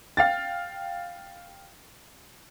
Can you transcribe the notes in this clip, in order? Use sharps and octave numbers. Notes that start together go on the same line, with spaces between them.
F5 G5 A6